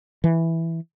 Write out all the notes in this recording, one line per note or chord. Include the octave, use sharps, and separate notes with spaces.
E3